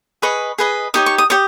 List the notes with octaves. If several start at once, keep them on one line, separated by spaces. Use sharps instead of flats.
G#4 B4 D#5 C#6
G#4 B4 D#5
D#4 G4 C#5 D#6
C#6
D#6
G4 C#5 D#6